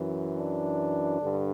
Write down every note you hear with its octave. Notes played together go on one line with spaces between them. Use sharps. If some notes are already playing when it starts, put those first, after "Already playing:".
Already playing: F#2 E3
D4
G2 D3